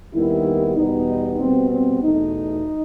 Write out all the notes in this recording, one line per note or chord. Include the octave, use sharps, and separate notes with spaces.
D#2 D#3 G3 B3 E4
E2 B2 G3 B3 D#4
B2 G3 B3 C4
C4
E2 B2 A3 D#4